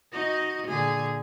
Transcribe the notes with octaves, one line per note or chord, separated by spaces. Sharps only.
D#4 F#4 D#5
A#2 D3 G#4